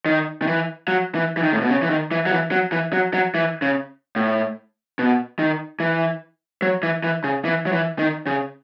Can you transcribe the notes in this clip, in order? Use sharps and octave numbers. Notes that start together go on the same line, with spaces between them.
D#3
D#3
E3
F#3
E3
E3
D#3
A2
B2
C#3
E3
D#3
E3
F#3
E3
F#3
E3
F#3
F#3
E3
C#3
A2
B2
D#3
E3
F#3
E3
E3
C#3
E3
F#3
E3
D#3
C#3